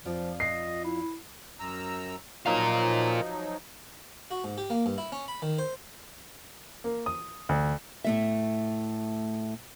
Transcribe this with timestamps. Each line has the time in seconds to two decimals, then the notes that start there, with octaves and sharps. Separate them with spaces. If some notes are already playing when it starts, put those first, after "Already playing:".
0.05 F2 F3 F4 D5
0.40 D#5 C7
0.84 E4
1.60 F#2 A#5 E6
2.46 F3 F#3 D#4 F4 A#4
4.31 F#4
4.44 G#2
4.58 G4
4.70 A#3
4.86 G2
4.98 E4
5.12 C#4
5.28 B5
5.42 D#3
5.59 C5
6.84 A#3
7.06 D#6
7.49 D2
8.04 A2 A3 E5